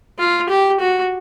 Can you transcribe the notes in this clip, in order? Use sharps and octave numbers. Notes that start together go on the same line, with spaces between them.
F4
G4
F#4